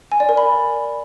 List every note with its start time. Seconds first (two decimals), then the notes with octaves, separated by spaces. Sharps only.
0.12 G#5
0.20 D5
0.29 A#4
0.37 B5